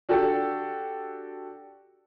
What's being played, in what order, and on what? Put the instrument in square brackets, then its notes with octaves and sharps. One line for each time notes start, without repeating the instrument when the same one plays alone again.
[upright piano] D4 F#4 G4 A4